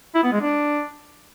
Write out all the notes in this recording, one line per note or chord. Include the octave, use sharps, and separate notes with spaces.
E4
B3
G#3
D4